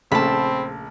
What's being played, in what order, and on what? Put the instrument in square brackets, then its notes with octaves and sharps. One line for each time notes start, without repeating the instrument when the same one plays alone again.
[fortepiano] A#1 C#3 A3 [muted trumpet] C4 [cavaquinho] A5 B5